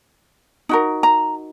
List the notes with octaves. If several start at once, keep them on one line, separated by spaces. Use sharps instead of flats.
D#4 F#4 A#4
A#5